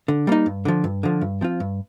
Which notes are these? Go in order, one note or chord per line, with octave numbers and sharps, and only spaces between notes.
D3
G3 A#3 D#4
G2
D3 F3
G2
D3 F3
G2
F3 C4 F4
G2